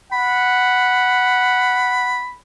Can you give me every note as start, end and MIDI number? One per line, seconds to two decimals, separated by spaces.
0.13 2.23 78
0.13 2.35 83